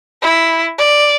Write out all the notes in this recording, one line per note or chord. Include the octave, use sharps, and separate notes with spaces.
E4
D5